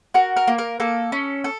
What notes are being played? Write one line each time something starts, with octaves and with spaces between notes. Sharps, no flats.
F#4 A#4
A#4
A#3
A#4
A#3 A4
C#4
A4